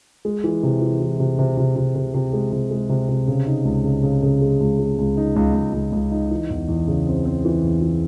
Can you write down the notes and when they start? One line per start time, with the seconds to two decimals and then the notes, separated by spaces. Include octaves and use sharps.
0.25 G#3
0.44 E3
0.63 C3
0.81 E3
1.00 E3
1.20 C3
1.39 C3
1.57 C3
1.76 C3
1.95 C3
2.14 C3
2.33 G#3
2.52 C3
2.71 G#3
2.89 C3
3.09 C3
3.28 C#3
3.47 D#4
3.65 C#2
3.84 C#3
4.03 C#3
4.22 C#3
4.41 G#3
4.60 C#2
4.79 G#3
4.98 C#2
5.17 D#4
5.36 C#2
5.54 C#2
5.73 C#2
5.92 C#2
6.12 D#4
6.31 E3
6.50 E2
6.69 E2
6.88 C#3
7.07 C4
7.25 C4
7.45 E3
7.63 E2
7.81 E3